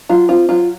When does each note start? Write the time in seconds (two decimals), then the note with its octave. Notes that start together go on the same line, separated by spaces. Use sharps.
0.09 F#3 F4
0.29 C4 F4
0.49 F#3 F4